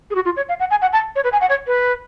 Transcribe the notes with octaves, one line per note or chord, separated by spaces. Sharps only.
G#4
F#4
F4
C#5
F5
F#5
G#5
F#5
A5
C#5
B4
G#5
F#5
C#5
B4